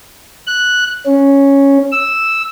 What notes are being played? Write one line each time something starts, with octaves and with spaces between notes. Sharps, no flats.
F#6
C#4
E6